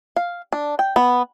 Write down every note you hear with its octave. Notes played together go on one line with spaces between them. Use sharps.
F5
D4
G5
B3